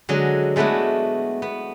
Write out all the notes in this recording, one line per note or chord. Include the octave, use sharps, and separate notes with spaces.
D3 F#3 G#3 D#5
G#3 A3 B3 D4 E4 F#4
B3